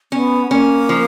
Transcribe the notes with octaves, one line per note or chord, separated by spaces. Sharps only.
B3 C#4
A#3 C#4
F3